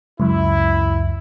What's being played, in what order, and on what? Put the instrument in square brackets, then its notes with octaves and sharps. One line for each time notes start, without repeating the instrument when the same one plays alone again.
[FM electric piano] C#2 F#2 [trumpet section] E4